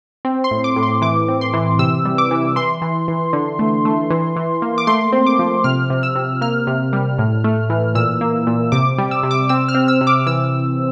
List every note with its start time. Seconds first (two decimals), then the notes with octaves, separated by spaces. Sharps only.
0.25 C4
0.44 C6
0.51 A2
0.64 D6
0.76 A2
0.83 C6
1.02 E3 D6
1.28 C4
1.41 C6
1.54 E3
1.79 C3 E6
2.05 G3
2.18 D6
2.31 E3
2.56 E3 C6
2.82 E3
3.08 E3
3.33 D3
3.59 A3
3.85 A3
4.10 E3
4.36 E3
4.62 A#3
4.78 D6
4.87 A3 C6
5.12 C4
5.26 D6
5.39 F3
5.64 C3 F6
5.90 C3
6.03 E6
6.16 C3
6.41 A#3 F6
6.67 C3
6.93 G3
7.18 A2
7.44 A3
7.70 E3
7.95 A#2 E6
8.21 A#3
8.47 A#2
8.72 C3 D6
8.98 G3
9.11 E6
9.23 C3
9.31 D6
9.49 C4 E6
9.68 F6
9.75 C4
9.88 E6
10.01 C3
10.07 D6
10.26 E3 E6